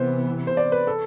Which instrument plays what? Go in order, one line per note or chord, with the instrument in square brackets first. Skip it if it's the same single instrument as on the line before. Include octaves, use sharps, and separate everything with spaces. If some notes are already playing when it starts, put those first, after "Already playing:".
Already playing: [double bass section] C3 E3 B3 [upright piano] C5
[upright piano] C5
D5
B4
A4